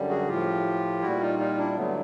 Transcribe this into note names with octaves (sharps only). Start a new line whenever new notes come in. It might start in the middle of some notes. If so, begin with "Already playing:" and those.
Already playing: F#2 D3 G3
F#4 G#4
A2 F3 F4 G4
A#2 G3 E4 F#4
D#4 F4
D#4 F4
D4 E4
G2 D3 F#3 A3 B3